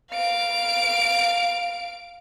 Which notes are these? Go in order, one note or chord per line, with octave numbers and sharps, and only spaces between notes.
F5 D7